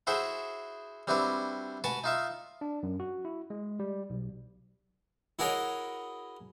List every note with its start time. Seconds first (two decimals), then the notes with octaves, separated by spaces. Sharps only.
0.07 E4 F#4 G#4 C5 E5 F#5
1.07 G3 C4 D4 E4 F#4 B4
1.84 F#4 B4 F#5 G#5 A5
2.04 D#4 F4 E5
2.61 D4
2.83 F#2
3.00 F#4
3.25 E4
3.50 G#3
3.79 G3
4.10 B1
5.39 E4 F#4 G#4 A#4 C#5 D#5